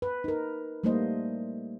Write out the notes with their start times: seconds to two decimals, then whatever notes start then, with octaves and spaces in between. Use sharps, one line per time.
0.02 B4
0.24 D#4 A#4
0.84 G3 A3 A#3 D#4 C5 D#5